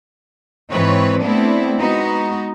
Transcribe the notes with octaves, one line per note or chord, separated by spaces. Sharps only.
G#2 E3 C4 B4 C#5
A3 B3 C4 D4 E4
G#3 B3 D#4 F#4